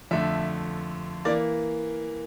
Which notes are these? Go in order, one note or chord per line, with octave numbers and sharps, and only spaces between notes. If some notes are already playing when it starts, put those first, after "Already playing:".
F2 D3 A3 E5
E3 A#3 D5